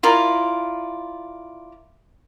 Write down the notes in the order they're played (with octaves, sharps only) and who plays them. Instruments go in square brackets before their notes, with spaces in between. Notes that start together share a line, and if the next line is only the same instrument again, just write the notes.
[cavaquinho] E4 F4 A#4 D5